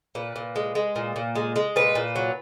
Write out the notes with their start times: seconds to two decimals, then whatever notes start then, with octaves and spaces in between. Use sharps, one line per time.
0.15 A#2 B4
0.36 A#2
0.56 G#3
0.75 G#3
0.96 A#2
1.16 A#2
1.36 G#3
1.56 G#3
1.76 A#2 B4
1.95 A#2
2.16 F#3